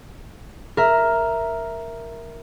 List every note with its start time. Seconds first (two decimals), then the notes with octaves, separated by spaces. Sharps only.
0.77 A#4 E5